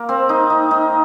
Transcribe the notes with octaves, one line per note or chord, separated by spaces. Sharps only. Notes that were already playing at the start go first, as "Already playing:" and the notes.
Already playing: A#3
C4
D#4
D#4
D#4